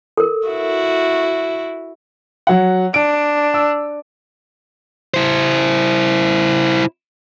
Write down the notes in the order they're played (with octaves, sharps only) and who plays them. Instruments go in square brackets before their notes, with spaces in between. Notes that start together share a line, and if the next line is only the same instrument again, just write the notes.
[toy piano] A4 A#4
[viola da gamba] E4 F#4
[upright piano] F#3 F#5
[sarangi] D4 [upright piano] D7
[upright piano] E6
[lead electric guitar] E4 C5